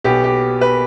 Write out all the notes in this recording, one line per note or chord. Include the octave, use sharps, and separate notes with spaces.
B1 B2 B3 G4
G4
B4